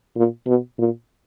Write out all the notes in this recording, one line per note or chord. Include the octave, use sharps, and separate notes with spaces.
A#2
B2
A#2